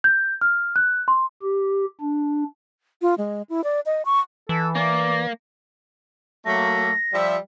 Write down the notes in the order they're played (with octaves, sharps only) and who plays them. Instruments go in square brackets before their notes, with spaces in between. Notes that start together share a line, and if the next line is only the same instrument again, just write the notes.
[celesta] G6
F6
F#6
C6
[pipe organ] G4
D4
[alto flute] F4
G#3
E4
D5
D#5
C#6
[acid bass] E3 [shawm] A4
[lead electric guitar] A#3 [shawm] D5
[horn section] F#3 A3 A#3 [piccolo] A#6
[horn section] F3 G3 E5